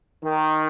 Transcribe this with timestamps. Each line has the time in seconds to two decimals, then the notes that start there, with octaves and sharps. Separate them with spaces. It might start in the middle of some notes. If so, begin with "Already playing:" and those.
0.24 D#3